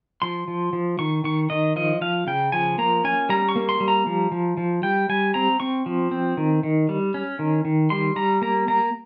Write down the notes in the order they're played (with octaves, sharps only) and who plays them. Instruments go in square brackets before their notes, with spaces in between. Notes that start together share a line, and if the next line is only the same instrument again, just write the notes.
[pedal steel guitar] F3 C6
F3
F3
D#3 C#6
D#3 C#6
D#3 D#5
F3 D#5
F3 F5
C#3 G5
F3 G#5
A#3 A#5
C#4 G#5
G3 A#5
C#6
A#3
C6
G3
A#5
F3
F3
F3
G3 G5
G3 G#5
C4 A#5
C4 C#6
F3
C4
D#3
D#3
G3
C#4
D#3
D#3
G3 C6
G3 A#5
A#3 A#5
A#3 A#5